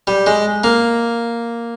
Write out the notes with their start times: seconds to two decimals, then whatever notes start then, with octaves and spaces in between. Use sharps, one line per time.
0.07 G3
0.27 G#3
0.64 A#3